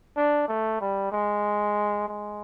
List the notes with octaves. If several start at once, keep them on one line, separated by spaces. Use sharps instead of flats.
D4
A3
G3
G#3
G#3